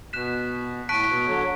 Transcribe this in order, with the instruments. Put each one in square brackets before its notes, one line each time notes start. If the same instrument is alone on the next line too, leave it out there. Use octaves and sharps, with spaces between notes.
[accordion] B2 [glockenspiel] F#6 B6 E7
[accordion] A2 [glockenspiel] A5 C#6 F#6 B6 D7
[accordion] B2
D3 F#3